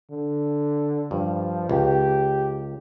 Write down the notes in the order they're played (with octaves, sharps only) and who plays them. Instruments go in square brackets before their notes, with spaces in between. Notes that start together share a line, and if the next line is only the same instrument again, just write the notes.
[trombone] D3
[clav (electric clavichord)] G2 [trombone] F3
[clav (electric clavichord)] C#2 [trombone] G4